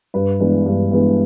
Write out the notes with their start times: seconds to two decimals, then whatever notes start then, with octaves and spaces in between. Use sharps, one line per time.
0.14 G2 B4
0.40 E3 G#3 B3 D4
0.66 G2
0.91 E3 G#3 B3 D4